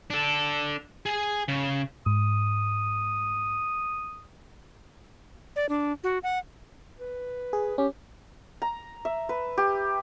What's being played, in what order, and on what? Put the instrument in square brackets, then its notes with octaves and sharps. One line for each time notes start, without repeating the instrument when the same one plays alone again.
[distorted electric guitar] D4 A4
G#4 G#5
C#3
[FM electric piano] G#2 [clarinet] D#6
[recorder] D5
D4
F#4
F#5
[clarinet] B4
[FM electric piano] G#4
[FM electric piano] C#4 [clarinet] G4
[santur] A#5
E5
B4
G4